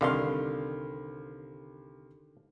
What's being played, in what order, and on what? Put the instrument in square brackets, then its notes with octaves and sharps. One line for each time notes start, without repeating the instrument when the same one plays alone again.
[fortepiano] C2 F5 C6 [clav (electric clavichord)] D3 D#3